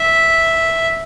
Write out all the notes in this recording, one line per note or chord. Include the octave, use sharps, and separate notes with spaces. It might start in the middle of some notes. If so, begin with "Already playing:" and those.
Already playing: E5